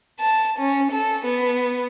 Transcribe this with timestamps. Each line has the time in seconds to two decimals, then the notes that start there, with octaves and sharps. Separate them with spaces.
0.20 A5
0.59 C#4
0.92 A4
1.25 B3